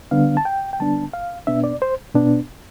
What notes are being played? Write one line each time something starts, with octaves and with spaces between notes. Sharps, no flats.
D3 G3 B3 D4 F5
A5
G5
G5
D3 G3 B3 D4 A5
F5
B2 B3 D4 E5
D5
C5
B2 B3 D4